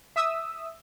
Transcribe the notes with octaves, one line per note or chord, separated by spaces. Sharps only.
E5 D#6 E6